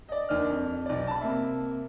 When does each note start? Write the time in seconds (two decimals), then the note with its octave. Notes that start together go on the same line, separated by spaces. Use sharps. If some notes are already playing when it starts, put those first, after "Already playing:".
0.09 D5 D#5
0.29 D#2 D4 F6
0.50 F2
0.86 B1 D5
1.07 A5 B5
1.21 C3 A#3 E5